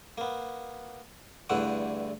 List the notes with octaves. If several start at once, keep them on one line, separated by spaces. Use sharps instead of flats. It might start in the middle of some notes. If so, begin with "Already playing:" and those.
A#3 B3
E2 G2 D3 E3 A3 F#5